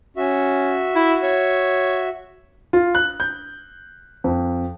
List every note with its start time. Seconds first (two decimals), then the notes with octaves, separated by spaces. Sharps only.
0.17 C#4 F#4 E5
0.95 E4
1.23 C#5
2.73 F4
2.95 F#6
3.20 G6
4.24 F2